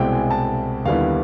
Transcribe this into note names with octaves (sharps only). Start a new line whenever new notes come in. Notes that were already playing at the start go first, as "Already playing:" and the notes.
Already playing: C2 B2 G#3 C4 E4 G5
G#5
A5
D#2 D3 G3 B3 E4 F5